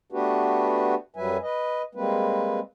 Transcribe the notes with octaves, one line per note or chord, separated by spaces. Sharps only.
A3 B3 D4 F#4 G4 B4
F#2 F#3 G3 B4 E5 G#5
B4 D#5
G3 G#3 A#3 C4 B4